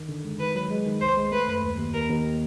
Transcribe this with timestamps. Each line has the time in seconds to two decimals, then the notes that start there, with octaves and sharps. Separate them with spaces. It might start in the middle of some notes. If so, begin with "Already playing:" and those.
Already playing: D#3
0.09 D3
0.24 G#3
0.39 D#3 B4
0.55 F#3
0.70 G#3
0.86 D#3
1.01 C2 C5
1.17 G#3
1.32 A3 B4
1.48 F#2
1.62 D#2
1.78 D#2
1.94 D#2 A#4
2.10 D#2